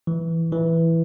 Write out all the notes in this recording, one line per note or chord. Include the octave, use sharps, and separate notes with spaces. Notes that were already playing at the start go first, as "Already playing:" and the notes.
E3
E3